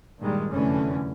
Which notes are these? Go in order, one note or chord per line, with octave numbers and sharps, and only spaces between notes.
G2 A#2 D#3 G3 G#3
F1 F#2 D3 E3 A3 C#4